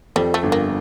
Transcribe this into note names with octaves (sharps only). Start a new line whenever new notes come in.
F2 G3
A3
G1
A#3